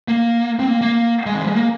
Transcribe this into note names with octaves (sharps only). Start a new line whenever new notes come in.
A#3
C4
A#3
A#3
G#3
D#3
F3
G#3
A#3